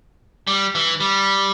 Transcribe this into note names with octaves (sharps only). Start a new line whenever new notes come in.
G3
E3
G3